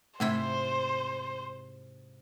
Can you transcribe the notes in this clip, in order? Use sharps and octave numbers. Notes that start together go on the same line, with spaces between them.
G#2 C3 A3 E4 C5